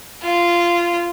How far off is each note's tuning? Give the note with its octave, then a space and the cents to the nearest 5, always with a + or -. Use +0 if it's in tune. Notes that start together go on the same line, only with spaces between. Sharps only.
F4 -15